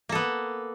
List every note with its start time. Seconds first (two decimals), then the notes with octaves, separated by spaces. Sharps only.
0.09 A#3
0.12 A4
0.15 B3